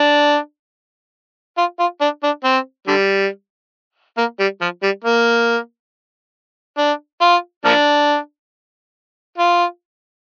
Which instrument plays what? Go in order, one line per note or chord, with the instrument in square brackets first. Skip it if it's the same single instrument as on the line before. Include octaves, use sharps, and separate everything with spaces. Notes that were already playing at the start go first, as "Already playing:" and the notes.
Already playing: [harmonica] D4
F4
F4
D4
D4
C4
D3 G3
A#3
G3
F3
G3
A#3
D4
F4
F3 A#3 D4
F4